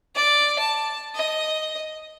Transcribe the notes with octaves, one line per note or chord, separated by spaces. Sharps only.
D5
A5
D#5